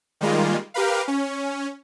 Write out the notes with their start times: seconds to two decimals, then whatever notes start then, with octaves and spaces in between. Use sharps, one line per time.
0.21 D#3 G3 G#3 A#3 F4
0.74 G4 A#4 B4 F5
1.08 C#4